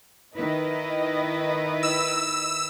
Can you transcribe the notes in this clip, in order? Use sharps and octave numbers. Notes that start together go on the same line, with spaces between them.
D#3 E4 B4 D#5
E6